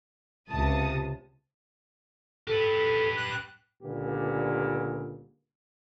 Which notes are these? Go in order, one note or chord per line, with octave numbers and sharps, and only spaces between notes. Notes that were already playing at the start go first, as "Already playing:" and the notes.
C#2 C3 A5 D#6
G4 A4 B4
F#6
C#2 A#2 D3 G3 B3 G4